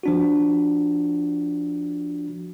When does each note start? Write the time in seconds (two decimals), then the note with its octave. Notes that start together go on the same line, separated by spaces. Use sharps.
0.03 F3 D4 F#4